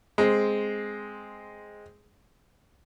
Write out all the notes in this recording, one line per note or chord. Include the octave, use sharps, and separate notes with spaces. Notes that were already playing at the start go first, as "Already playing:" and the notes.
G#3 C4